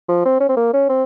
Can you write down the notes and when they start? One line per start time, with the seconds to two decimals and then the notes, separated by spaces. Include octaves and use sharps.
0.09 F3
0.25 C4
0.40 C#4
0.49 C4
0.57 A#3
0.73 C#4
0.89 C4